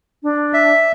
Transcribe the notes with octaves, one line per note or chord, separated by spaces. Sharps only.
D4
E5